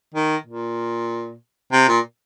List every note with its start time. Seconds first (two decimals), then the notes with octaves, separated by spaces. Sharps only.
0.14 D#3
0.46 A#2
1.73 C3
1.88 A#2